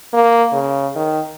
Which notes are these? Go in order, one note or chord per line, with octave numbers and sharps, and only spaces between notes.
A#3
C#3
D#3